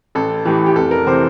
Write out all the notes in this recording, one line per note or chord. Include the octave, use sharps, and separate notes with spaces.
A1 A4
A2 E3 G4
G4
F1 A4
A#4
C3 E3 C5